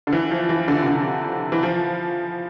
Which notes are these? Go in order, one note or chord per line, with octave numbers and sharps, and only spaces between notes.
D3
E3
F3
E3
D3
C3
D3
E3
F3